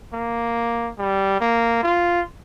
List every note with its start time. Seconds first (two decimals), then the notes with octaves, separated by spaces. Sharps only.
0.13 A#3
0.98 G3
1.40 A#3
1.83 F4